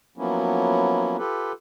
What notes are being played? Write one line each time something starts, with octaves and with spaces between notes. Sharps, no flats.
F3 F#3 A#3 B3 C#4 E4
F4 G4 A4 B4